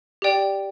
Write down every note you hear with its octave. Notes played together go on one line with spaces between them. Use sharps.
G4 D5 G5